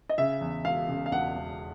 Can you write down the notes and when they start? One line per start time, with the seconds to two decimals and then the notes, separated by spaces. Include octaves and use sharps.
0.10 D#5
0.18 C#3 E5
0.41 E2
0.65 E1 F5
0.88 C#3
1.06 F5
1.12 E1 F#5
1.35 E1